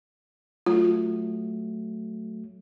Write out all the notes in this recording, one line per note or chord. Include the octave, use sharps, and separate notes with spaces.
F#3 A3 F4